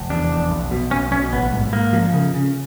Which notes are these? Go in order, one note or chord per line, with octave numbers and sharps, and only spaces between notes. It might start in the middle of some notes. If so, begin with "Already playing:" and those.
Already playing: F1
E2 D4
F1
B1
B2
B1 C#4
B1 C#4
A1 B3
G#2
G#2 A#3
F3
C#3
C#3